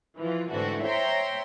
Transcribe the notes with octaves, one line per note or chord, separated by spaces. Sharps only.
E3 F3 F4
G#2 D3 E3 A3 C4 F#4
C5 C#5 E5 G5 A#5 C6